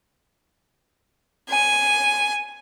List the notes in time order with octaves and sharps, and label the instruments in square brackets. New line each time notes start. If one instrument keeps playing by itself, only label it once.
[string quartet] G#5